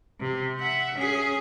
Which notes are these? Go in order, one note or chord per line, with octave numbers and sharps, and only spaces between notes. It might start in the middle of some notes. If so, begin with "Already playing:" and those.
C3
E5 F#5
C#4 G#4